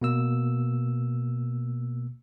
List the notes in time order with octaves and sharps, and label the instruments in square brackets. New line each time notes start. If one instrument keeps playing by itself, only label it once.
[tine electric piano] B2 A#3 E6